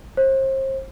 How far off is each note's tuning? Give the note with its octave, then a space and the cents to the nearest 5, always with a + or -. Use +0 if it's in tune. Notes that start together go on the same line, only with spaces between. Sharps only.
C5 +35